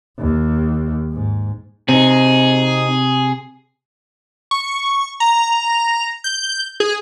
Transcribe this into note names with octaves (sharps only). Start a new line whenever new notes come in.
D#2
G#2
C3 C4 D#4 G#4
C#6
A#5
G6
G#4